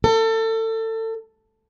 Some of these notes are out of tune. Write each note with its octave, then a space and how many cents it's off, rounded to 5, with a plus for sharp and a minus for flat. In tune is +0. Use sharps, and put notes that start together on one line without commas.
A4 +30